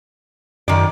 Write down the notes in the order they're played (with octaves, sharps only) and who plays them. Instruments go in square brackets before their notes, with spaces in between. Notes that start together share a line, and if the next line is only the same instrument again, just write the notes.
[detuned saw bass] F#2 [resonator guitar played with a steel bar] D#3 D5